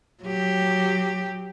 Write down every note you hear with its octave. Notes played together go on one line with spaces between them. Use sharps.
F#3 G4